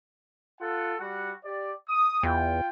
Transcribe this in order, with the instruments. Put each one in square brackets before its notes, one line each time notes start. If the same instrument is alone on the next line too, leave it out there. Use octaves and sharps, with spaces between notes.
[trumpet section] F4 A4 F#5
G3 F#4 F#5
G4 D5
D#6
[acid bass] E2 [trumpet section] F4 G5